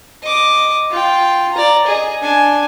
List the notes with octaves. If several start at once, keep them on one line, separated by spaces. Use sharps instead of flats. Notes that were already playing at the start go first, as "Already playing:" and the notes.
D#5 D6
F4 G5
D5 A#5
G#4 D#5
D4 G#5